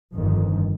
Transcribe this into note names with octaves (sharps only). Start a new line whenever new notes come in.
G1 F2 D#3